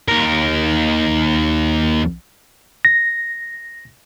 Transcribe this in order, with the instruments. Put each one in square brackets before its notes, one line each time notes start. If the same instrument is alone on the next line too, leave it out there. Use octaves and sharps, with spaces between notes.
[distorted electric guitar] D#2 A#4
[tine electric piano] A#6